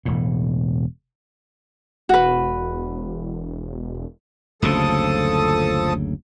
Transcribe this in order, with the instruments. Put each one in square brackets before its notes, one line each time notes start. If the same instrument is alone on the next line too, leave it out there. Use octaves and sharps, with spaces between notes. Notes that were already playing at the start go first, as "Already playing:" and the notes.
[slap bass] E1 A2
[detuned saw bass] E1 [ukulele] F#4 B4
[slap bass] F#1 D2 C#3 [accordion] F3 A4 D#6